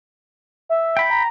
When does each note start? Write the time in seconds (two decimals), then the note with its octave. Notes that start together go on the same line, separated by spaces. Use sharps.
0.69 E5
0.97 G5 B5
1.10 A#5